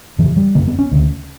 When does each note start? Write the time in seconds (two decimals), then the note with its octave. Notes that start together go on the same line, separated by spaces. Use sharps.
0.19 F#2 E3
0.24 C#3
0.37 G3
0.55 F#2 C#3 A#3
0.68 B3
0.79 C#4
0.92 D2 C#3